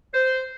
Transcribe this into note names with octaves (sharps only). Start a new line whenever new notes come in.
C5